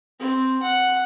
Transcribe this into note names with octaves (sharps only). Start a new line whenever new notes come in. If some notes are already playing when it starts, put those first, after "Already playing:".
C4
F#5